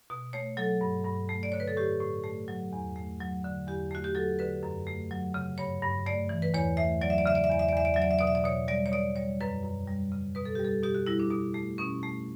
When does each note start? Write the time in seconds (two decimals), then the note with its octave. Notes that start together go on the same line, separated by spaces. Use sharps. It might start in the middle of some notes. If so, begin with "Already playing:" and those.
0.10 B2
0.33 A3 C#5
0.57 F#3 A4
0.81 G2
1.05 G2
1.29 A3
1.43 D5
1.52 D3 C#5
1.60 B4
1.68 A4
1.77 A2 G4
2.00 A2
2.24 A3
2.48 F#3
2.73 E2
2.96 A3
3.20 F#3
3.44 D3
3.67 E2 G4
3.91 A3 F#4
4.04 G4
4.15 F#3 A4
4.39 D3 B4
4.63 F#2
4.87 A3
5.11 F#3
5.34 C#3
5.58 G2 C#5
5.82 G2
6.06 A3 D5
6.29 E3
6.42 B4
6.54 E2 C#5
6.77 A3 E5
7.01 F#3 D5
7.10 E5
7.18 D5
7.25 C#3 E5
7.35 D5
7.44 E5
7.49 E2 D5
7.59 E5
7.69 D5
7.73 E2 E5
7.85 D5
7.94 F#3 E5
8.02 D5
8.11 E5
8.19 B2 D5
8.27 E5
8.35 D5
8.44 B2 C#5
8.68 G3 D5
8.86 C#5
8.92 B2 D5
9.16 G3 C#5
9.41 F#2 B4
9.64 F#2
9.87 G3
10.12 C#3
10.35 B2 B4
10.45 A4
10.55 G3 G4
10.65 A4
10.83 B2 G4
10.95 F#4
11.07 G3 E4
11.20 D4
11.31 B2 D4
11.54 A3
11.78 B2 C#4
12.03 A3